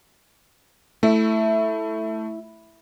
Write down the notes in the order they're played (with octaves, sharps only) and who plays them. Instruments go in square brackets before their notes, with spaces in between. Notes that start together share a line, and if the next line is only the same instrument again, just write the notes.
[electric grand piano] A3 [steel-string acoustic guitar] E4